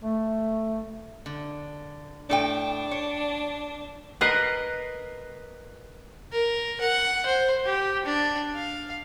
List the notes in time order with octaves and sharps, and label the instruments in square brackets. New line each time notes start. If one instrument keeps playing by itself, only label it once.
[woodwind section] A3
[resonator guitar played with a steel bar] D3
[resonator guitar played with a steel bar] A2 A4 G5 [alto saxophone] D4
[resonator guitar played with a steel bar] C#5
[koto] A#4 B4 D#5 [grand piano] F#6 C7
[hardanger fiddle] A#4
F#5
C5
G4
D4
F5